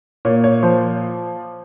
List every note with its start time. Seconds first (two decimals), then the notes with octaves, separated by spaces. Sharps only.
0.25 A#2 C#5
0.44 C#5
0.63 F3 C5